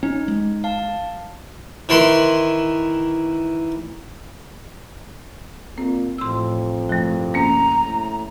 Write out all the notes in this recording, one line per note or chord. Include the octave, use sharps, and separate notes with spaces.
C#4 D#4
G#3
F5 A5
D#3 E3 C6
A#2 C4
A1 F2 C6 E6
C2 G2 F3 A3
A#3 C#4 A#5
A2